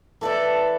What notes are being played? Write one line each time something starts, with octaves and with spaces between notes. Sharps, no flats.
E3 A3 E4 A4 B4 D5